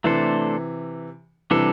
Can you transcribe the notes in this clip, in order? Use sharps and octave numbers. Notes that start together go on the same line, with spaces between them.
C3 E3 A3 D4 A4 C5
C3 E3 G3 D4 A4